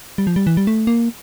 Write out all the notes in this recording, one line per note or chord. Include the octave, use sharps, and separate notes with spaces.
G3
F3
G3
E3
G3
A3
A#3